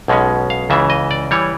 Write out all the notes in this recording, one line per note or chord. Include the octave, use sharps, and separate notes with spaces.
B1 B2 G#3 C#4
F5
C#2 C#3 E3 E5
D#5
D5
E3 G3 C#5